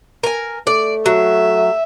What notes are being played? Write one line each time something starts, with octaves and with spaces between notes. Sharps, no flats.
A#4 G#5
A3 D5
F#3 E5